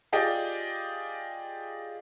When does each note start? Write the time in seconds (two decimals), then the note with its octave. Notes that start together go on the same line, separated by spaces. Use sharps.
0.12 F4 G4 G#4 D5 D#5 G5